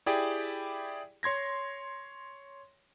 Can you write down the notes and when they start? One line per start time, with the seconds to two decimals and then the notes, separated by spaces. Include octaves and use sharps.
0.06 E4 G4 G#4 D5 G5
1.23 C#5 C6 G#6 A#6